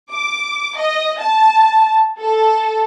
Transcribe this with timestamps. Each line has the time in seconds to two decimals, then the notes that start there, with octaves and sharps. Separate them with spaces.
0.12 D6
0.77 D#5
1.19 A5
2.19 A4